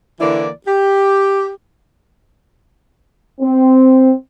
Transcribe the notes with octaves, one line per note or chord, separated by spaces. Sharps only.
D3 E3 A#3 E4 D5
G4
C4